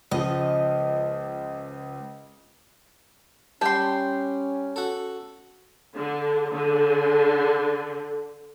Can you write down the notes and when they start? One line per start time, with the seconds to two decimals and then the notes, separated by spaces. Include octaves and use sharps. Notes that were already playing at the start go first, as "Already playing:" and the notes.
0.11 C#2 F3 D#5
3.61 G3 C#4 G5 A5 C6
4.76 F#4 A4
5.94 D3
6.52 D3